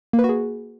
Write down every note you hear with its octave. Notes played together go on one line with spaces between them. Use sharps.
A#3
B4
F#4
G#4